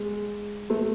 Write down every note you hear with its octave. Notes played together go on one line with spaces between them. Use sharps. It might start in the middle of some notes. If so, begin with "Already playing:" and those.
Already playing: G#3
A3